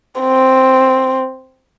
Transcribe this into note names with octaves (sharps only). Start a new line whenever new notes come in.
C4